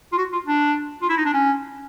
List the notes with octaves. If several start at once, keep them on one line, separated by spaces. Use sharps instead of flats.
F4
F#4
F4
D4
F4
E4
D#4
D4
C#4